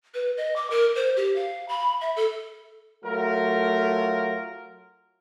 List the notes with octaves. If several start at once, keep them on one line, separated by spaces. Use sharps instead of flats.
B4
D#5
D6
A#4
C5
G4
F5
B5
E5
A4
F#3 A3 F4 A#4